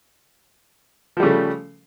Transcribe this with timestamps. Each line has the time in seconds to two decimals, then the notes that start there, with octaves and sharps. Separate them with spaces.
1.17 F3
1.20 G3
1.23 C#3
1.26 A3